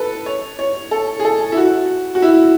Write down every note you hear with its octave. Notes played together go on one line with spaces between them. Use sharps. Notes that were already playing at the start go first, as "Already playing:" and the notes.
Already playing: A4 B4
C#5
C#5
A4
G#4
A4
E4
F#4
F#4
E4